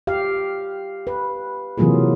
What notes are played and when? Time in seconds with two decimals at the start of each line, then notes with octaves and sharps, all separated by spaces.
0.07 G4 F5
1.07 B4
1.78 C3 E3 F#3 A#3 F4 G#4